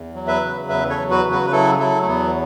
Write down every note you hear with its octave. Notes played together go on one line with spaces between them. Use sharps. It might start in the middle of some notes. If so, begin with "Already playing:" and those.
Already playing: E2
F#3
B4 E5
C#3
E2 B4 E5
A4 C#5
F#3
F#4 B4
C#3
F#4 B4
B4
F#3 E4 A4
F#3 E4 A4
A3
E2 B3